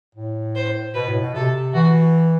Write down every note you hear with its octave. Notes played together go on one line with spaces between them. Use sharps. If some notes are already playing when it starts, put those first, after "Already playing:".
A2
C5
B2 B4
A2
B2
C3 A4
E3 F#4